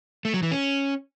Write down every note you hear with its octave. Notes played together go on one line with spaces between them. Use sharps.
A3
F#3
E3
C#4